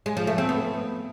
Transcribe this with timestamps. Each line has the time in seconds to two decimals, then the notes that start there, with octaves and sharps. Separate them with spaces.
0.06 G#3
0.17 F3
0.27 A3
0.38 C4
0.49 B3